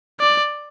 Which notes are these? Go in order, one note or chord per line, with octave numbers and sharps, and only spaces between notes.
D5